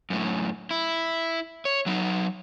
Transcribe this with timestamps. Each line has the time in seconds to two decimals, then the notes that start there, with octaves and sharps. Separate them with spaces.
0.10 F#2 A2
0.71 E4
1.65 C#5
1.86 F#3 D#4